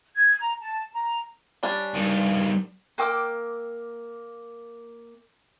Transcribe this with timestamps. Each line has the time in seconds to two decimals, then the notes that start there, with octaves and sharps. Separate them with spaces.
0.15 G#6
0.40 A#5
0.61 A5
0.93 A#5
1.63 G3 C#4 D4
1.94 G2 D#3
2.98 A#3 G5 D6 E6